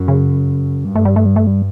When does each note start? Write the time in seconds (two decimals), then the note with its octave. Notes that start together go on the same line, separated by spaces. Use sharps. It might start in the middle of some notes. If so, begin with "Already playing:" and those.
Already playing: F#2
0.08 C#3
0.85 G2 G3
0.95 A3
1.05 G3
1.16 A3
1.26 G3
1.36 A3
1.47 G3